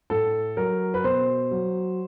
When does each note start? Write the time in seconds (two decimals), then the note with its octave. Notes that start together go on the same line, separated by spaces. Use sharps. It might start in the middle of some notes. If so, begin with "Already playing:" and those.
0.10 A2 A4
0.57 F#3 A#4
0.94 B4
1.04 B2 C5
1.51 F#3